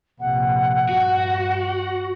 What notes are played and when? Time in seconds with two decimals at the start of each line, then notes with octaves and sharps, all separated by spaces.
0.20 A#1 C3 F#5
0.89 G2 F#4